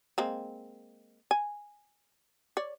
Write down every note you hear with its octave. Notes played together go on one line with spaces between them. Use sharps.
G#3 A#3 C4
G#5
C#5 D5